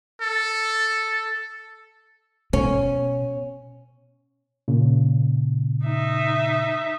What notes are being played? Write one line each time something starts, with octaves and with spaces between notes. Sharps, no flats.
A4
B2 C#4
A#2 C#3
D#4 E5